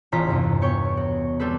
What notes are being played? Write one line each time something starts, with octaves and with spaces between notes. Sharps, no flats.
E1 A1 F4 A#5 B6
E2 G2 C3
B3 C#5 G5 C#6
F#4
G3 C4 A4 B4